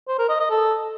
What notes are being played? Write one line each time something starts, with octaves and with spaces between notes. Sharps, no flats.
C5
A#4
D#5
D#5
A4